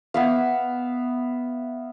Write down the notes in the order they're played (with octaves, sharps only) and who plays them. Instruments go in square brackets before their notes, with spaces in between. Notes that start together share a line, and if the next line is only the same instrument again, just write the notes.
[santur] B3 E5 F5